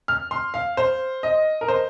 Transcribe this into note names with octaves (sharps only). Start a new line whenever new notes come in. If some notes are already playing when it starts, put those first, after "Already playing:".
F6
C6
F5
C5
D#5
A#4
C5